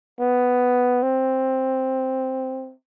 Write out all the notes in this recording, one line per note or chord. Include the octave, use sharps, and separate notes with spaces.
B3
C4